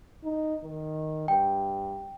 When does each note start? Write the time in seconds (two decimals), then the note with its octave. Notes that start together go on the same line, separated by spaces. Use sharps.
0.24 D#4
0.64 D#3
1.28 G2 G5